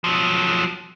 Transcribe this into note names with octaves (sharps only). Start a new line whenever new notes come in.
F3 F#3